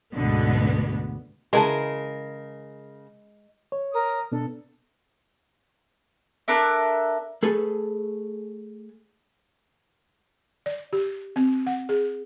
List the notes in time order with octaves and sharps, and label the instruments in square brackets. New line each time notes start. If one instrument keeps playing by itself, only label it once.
[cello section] D2 G#2 B2 D3 B3
[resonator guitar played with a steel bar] C#3 A#4 [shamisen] E3 B4 A5 [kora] G#3
[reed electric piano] C#5
[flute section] A#4 D#6
[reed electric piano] B2 B3 D4 [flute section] A4
[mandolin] D4 A4 A#4 E5
[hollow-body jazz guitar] A3 G#4 A4 B4
[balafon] D5
G4
C4
F#5
G#4